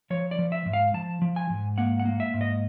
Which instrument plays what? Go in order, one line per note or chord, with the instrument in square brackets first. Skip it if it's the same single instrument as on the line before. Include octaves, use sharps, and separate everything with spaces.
[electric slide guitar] F3 C#5
D5
F3
E5
G#2
F5
F3 A5
F3
G#5
G#2
A#3 F#5
F#5
A#3
E5
G#2
D#5